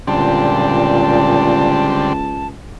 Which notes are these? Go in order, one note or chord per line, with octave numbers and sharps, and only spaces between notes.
C#2 A#2 D3 G3 C4 A5